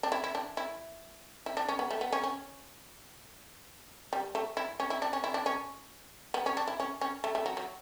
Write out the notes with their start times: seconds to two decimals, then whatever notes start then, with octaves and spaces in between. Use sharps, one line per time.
0.03 D4
0.12 E4
0.24 E4
0.35 D4
0.57 E4
1.46 E4
1.57 D4
1.69 C#4
1.79 B3
1.91 A3
2.01 B3
2.12 C#4
2.24 C#4
4.13 G3
4.35 A3
4.57 E4
4.80 C#4
4.90 E4
5.02 D4
5.13 C#4
5.24 E4
5.34 D4
5.46 C#4
6.34 B3
6.46 C#4
6.57 D4
6.68 E4
6.80 C#4
7.01 C#4
7.24 A3
7.35 A3
7.46 F#3
7.57 F#3